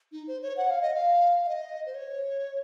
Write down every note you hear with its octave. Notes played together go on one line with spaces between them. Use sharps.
D#4
C5
C#5
F#5
F5
D#5
F5
F5
D#5
C5
C#5